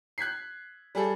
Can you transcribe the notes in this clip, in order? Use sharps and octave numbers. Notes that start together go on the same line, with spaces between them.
F#6 G#6 B6 C7
G3 G#4 A4